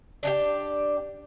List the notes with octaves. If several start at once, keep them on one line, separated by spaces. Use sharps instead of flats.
D4 F#4 G4